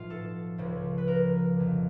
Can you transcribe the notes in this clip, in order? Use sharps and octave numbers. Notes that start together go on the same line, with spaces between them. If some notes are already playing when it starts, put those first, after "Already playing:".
Already playing: B1 A2 F3 F4
A4
C#2 C#3 F3
B4
A#4
G1 F2 D3